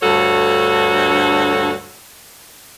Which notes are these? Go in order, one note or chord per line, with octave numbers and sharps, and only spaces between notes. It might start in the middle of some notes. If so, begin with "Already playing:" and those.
D2 G2 F#4 A4 C#5